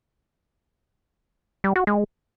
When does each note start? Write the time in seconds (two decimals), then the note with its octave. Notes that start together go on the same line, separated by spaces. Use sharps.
1.64 G3
1.76 F#4
1.87 G#3